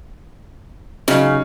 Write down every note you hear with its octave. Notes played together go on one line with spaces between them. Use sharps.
C#3 F#3 C#4 D#4